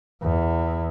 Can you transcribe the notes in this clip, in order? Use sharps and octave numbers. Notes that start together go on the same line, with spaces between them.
E2